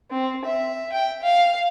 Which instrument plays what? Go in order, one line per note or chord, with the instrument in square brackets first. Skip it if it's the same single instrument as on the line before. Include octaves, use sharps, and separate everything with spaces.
[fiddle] C4
E5
G5
F5